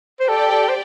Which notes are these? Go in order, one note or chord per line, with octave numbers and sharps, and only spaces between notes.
C5
G4 A4 D5 G5
A4
C5